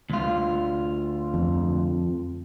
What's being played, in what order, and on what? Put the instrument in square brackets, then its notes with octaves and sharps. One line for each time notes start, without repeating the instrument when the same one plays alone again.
[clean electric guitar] D2 F4
[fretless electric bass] F2